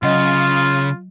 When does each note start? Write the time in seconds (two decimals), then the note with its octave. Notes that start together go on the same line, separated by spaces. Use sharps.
0.03 C#3 F#3 F4 D#5